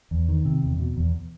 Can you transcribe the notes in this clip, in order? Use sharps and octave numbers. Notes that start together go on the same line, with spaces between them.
E2
D#3
C3
E2
B2
E2